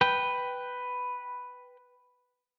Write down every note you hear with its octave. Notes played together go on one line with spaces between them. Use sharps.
B4 G5